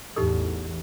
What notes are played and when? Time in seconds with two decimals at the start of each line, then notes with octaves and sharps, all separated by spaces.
0.16 A1 E2 D#4 G4 A4